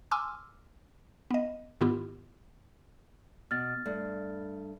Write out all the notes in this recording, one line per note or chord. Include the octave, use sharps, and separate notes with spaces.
G#5 C6 D6 E6 F6
B3 D#5
G#2 D#3 B3 E4 F4 G4
B2 F6 A6
G2 A3